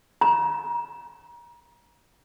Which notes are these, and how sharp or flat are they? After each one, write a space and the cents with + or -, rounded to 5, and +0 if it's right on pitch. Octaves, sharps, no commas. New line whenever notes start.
A#5 +30